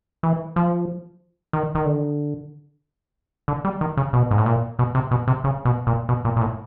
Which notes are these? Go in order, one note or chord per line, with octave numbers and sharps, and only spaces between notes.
E3
F3
D#3
D#3
D3
D3
G3
D#3
C#3
B2
G#2
A2
A#2
B2
C3
B2
C3
C#3
B2
A#2
B2
A#2
A#2
A2